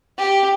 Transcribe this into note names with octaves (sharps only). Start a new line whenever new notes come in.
G4